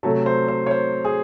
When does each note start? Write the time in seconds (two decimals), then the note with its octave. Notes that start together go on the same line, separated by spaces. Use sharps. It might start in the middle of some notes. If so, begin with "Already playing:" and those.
0.03 C3 F#3 A3 A4
0.26 C5
0.48 C5
0.66 C#5
0.71 C5
1.05 G#4